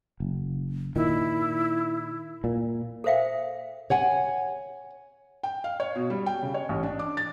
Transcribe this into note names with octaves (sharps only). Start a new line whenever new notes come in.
F#1
A#2 D#3 E4
A#2
A4 A#4 C5 E5 F5 G5
C#5 F#5 G#5
G5
F5
C#5
B2
G3
G5
C#3
C#5
A1
D4
D6
A6